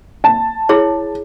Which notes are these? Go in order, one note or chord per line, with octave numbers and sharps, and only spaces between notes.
A5
E4 G#4 C#5